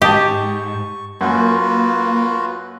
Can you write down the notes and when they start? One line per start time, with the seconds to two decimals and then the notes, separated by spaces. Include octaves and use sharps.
0.02 G#2 G4 D#5 A5 C#6
1.21 F#2 A#3 F4 F#4 B4